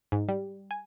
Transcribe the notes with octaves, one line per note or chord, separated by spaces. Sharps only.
G#2
G3
G#5